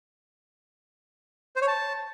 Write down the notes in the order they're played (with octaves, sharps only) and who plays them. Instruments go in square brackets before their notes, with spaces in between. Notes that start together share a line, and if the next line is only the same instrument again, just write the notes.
[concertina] C5
C#5
A5